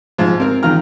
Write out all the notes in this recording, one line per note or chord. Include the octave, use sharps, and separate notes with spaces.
G#2 F3
C4 A#4
E2 D#3 F4 A#5 F6